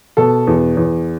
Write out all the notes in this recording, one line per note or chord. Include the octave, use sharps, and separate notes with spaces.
B2 A4
E2
E2